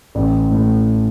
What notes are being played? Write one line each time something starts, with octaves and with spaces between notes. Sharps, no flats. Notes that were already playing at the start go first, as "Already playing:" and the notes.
A1
A2